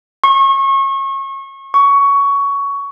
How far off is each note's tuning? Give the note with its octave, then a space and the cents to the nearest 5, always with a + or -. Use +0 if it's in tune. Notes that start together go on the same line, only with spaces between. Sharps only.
C#6 -30
C#6 +15